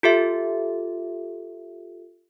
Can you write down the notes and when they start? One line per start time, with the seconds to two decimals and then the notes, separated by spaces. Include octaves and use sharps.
0.03 F4 G4 A4 E5